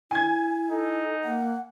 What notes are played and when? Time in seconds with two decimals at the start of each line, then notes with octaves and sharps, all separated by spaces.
0.11 E4 G#5 G#6
0.70 D#4 A4
1.23 A#3 F#5